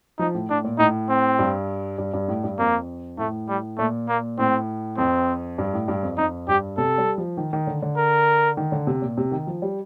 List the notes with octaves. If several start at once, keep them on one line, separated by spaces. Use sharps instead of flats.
F3 D#4
A2
A2 D4
A#2
A2 D#4
C4
G2
G2
G2
A2
G2
F2 A#3
A2 A3
G3
A#2 A3
A#3
A2 C4
F2 C4
G2
A2
G2
F2
F2 D#4
G2 G4
C3 A4
G3
F3
D#3
D#3
D3
D3
A#4
D#3
D3
C3
A#2
C3
D#3
F3
G3